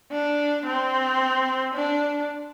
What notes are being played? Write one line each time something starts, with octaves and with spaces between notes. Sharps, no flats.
D4
C4
D4